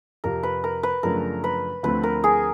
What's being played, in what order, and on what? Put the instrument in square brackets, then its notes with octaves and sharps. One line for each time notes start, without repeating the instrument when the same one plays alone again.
[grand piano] F2 C3 F3 [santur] A#4
[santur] B4
A#4
B4
[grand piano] F#2 C#3 F3 A3 D4 [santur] A#4
[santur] B4
[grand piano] D2 D3 F3 A3 C4 [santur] B4
[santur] A#4
G#4